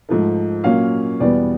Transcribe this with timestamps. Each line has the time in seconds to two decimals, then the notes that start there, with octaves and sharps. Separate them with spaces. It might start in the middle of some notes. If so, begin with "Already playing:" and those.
0.09 G#2 F3 A3
0.64 A#2 F#3 A#3 C#4 F5
1.20 E2 B2 G3 B3 D5